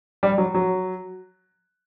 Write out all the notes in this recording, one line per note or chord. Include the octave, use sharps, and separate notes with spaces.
G3
F#3
F#3